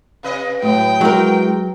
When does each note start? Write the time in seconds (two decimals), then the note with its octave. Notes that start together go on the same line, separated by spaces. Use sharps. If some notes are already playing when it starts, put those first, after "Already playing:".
0.23 C3 B4 D#5
0.62 A2 F#3 A3 B3 G5
1.01 F#3 G#3 E4 F#4 A#4